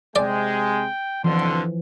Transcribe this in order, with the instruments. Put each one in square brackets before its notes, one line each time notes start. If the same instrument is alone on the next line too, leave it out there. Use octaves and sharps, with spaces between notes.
[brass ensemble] C3 G#3 [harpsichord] D5 [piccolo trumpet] G5
[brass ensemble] F2 B2 D3 [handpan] E3 F3 [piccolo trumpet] C6